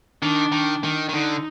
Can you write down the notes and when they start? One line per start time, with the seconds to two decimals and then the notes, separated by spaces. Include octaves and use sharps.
0.22 D#3 D4
0.52 D#3
0.84 D#3
1.09 D#3
1.13 D3 D#4